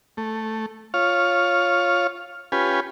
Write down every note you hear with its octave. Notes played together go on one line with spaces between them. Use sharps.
A3
F4 C#5 F5
C#4 F4 G4 B4 G#5